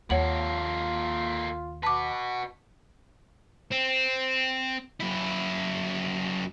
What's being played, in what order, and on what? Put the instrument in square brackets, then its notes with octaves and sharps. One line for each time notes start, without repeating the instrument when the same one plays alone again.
[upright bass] D#2 [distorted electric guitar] A#3 A4 [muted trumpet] F4 [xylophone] C#5 F#5 F#7
[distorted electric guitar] F#4 B4 [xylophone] A5 D6
[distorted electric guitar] C4
F#2 E4